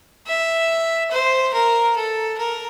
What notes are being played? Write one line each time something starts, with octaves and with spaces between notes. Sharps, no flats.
E5
C5
A#4
A4
A#4